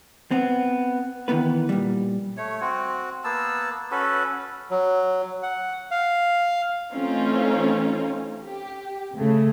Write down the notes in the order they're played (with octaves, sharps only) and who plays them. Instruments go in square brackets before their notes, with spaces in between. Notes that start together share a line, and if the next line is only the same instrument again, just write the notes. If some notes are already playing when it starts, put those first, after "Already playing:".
[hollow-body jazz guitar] B3 C4
D#3 E3 B3 B4
A#2 G3
[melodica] A3 C#5
C4 F#4
A#3 B3 A5 E6
C#4 F#4 A4 B4
[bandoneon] F#3
F#5
F5
[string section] E3 A3 C4 C#4 D#4 F4
G4
C#3 A3